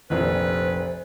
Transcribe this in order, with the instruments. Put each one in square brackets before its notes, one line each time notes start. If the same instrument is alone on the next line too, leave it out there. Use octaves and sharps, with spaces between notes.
[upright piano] F1 A#1 [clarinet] B4 [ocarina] C5